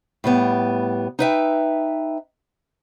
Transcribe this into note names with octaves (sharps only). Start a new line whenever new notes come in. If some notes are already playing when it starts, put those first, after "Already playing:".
A2 G3 B3
D#4 B4 E5 G5